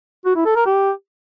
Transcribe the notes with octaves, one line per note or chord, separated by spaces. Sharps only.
F#4
E4
A4
A#4
G4